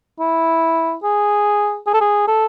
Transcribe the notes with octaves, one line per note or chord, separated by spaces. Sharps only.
E4
G#4
G#4
A4
G#4
A4